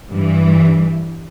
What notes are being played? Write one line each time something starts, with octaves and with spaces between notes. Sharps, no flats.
G2 E3